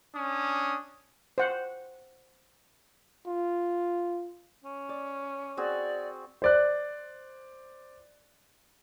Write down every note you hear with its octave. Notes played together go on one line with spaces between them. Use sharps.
C#4 D4 D#6
C5 F#5
F4
C#4
D5
C4 F#4 G#4 D5
C5 D5 F#6